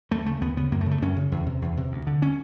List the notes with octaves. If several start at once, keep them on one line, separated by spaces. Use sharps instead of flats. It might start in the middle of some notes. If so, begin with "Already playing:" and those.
D#2 A3
C#3 A3
D#2 B3
C#3 B3
F#2 A#3
A3
C#3
A3
F#2 C#4
C#3
E2
C3
E2
C3
D2
D3
C#4